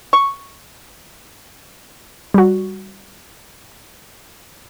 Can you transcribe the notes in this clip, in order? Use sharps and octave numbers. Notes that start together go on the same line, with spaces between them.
C#6
G3 F#4